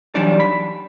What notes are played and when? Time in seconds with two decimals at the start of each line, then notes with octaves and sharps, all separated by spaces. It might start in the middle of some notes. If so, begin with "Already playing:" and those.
0.15 E3 F#3 G3 D4 D#4 D5
0.40 B5